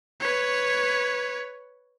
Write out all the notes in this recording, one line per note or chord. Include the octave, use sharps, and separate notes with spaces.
B4 C#5